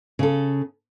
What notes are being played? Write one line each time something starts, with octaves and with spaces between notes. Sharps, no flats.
C#3 A4